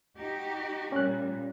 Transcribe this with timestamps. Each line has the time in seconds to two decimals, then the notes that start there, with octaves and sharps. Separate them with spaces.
0.17 D#4 F#4 G4
0.92 A#2 G3 C#4 F#6